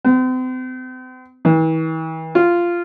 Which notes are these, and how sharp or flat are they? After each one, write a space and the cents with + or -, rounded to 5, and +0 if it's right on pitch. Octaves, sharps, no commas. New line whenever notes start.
C4 -40
E3 -45
F4 -10